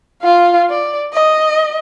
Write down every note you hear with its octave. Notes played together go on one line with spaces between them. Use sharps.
F4 F5
D5
D#5